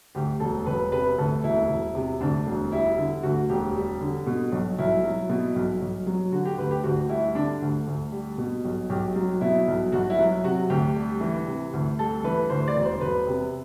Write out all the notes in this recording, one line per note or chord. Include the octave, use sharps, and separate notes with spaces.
D2 G4
E1 A4
E1 B4
C3 B4
D2 A4
E1 E4
E1
C3
D2 D4
E1
G3 E4
D3
D2 F#4
E1 G4
G3
D3
B2
B1
B1 E4
F#3
B2
B1
B1
F#3
D3 F#4
G4
D2 B4
G4
D2 F#4
G3 E4
D3 D4
D2
D2
G3
B2
B1
B1 G4
F#3
B2 E4
B1
B1 F#4
E4
F#3
C3 F#4
D2 G4
G3
E3
C3
D2
G3 A4
E3 B4
D2 C5
D5
E1
C5
E1 B4
C3